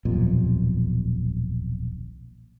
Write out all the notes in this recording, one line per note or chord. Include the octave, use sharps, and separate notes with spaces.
D#1 B1 F2 A#2